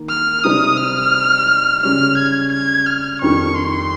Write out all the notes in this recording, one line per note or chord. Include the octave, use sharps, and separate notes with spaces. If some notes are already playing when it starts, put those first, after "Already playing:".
Already playing: D#3 A#3
F6
C3 G3 C4 D#4 D#6
F6
C#3 G3 C#4 F6
G#6
G#6
F6
F2 D#3 G3 C#6
C6